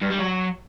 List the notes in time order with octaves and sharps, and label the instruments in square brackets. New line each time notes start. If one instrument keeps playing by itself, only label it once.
[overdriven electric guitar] G2
G3
F#3